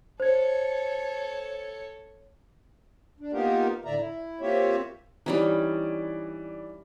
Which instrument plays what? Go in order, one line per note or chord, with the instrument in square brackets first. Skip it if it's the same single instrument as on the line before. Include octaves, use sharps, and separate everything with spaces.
[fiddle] A4 C#5 [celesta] C5 G#6
[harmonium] D4
A#3 B3 D#4 F4 G4 A#4
D2 A2 D3 D5 E5 A#5
E4
A#3 C4 F4 G4 C#5 E5
[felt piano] E3 D5 [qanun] G3 C#4 D#4